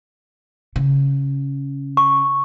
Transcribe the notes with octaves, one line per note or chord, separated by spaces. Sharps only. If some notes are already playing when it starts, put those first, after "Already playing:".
C#3
C#6